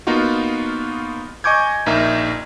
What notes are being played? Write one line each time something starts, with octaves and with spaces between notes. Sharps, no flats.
A#3 B3 D#4 F4 F#4
D#5 G#5 C#6 D6 G6 G#6
A#1 A#3 D#4 A#4 E5